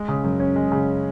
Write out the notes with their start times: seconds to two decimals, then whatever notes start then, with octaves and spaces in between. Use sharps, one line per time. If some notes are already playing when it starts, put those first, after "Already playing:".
Already playing: G#3
0.08 C#3
0.24 F#2
0.40 C#4
0.56 G#3
0.72 C#3